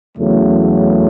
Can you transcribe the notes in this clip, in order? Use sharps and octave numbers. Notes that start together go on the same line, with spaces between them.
E2 C#3 F#3 A3